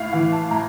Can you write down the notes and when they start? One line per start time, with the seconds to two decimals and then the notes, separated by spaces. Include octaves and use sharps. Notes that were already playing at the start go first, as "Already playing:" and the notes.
Already playing: A2 F5
0.13 E3 F5
0.32 A5
0.51 A2 A#5